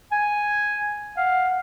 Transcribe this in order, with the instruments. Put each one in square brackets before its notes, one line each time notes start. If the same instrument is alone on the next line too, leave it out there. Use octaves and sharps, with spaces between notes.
[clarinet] G#5
[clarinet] F5 [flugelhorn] F#5